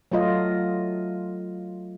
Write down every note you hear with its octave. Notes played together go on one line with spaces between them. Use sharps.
F#3 A3 F4 D#5